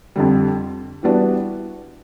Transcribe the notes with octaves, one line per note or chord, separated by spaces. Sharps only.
F2 D3 G3
E3 G3 B3 D4 F#4